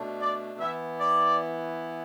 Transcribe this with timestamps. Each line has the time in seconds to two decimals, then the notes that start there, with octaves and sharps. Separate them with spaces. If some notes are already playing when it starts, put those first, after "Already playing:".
Already playing: B2 A3 D4
0.19 D5
0.59 E3 B3 E4 E5
0.99 D5